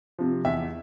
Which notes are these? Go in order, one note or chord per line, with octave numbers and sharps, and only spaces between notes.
C3 F3
E2 E5